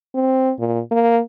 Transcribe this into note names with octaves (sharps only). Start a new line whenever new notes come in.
C4
A#2
A#3